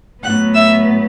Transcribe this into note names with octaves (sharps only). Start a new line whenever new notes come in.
A2 F#3 B3 F#5 F#6
E5 E6